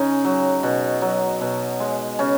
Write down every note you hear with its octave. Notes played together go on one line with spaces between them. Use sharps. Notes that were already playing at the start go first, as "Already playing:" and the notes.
Already playing: C#3 C#4 D#4
F#3
B2
F#3
B2
G#3
C#3 C#4